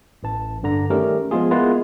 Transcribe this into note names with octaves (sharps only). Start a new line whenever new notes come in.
A1 E3 A5
G2 D3 A#5
D#3 G3 A3 C#4 G4 A#4
F3 G#3 B3 F4 G#4
G#3 A#3 B3 E4 F4 B4